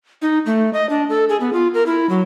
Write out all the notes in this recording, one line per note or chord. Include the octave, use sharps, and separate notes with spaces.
D#4
A3
D#5
D4
A4
G#4
B3
F4
A#4
E4
F#3